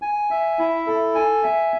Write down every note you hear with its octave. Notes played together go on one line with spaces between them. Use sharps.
G#5
E5
E4
A4
G#5
E5